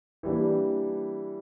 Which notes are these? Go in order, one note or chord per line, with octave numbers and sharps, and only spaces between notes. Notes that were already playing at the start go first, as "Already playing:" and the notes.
E3 G3 A#3 D4